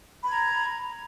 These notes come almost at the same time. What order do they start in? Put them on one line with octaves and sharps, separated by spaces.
B5 G#6 A#5